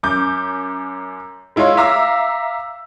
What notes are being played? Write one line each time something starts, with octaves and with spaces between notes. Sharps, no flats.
F#2 D6 G6
G#3 E4 F4 C#5 C6
E5 F5 A#5 D6 E6